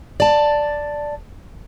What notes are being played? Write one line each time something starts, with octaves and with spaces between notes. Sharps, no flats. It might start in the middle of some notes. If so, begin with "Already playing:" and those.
D5 A5